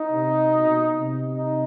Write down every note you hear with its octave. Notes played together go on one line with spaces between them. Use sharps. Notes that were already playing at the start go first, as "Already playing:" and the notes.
Already playing: D#4
C3
B2
C3
D#4